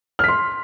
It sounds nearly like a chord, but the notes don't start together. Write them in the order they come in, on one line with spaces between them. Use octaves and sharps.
F6 B6 C6